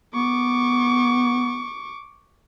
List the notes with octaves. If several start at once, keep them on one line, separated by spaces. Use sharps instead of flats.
B3 C#6 D6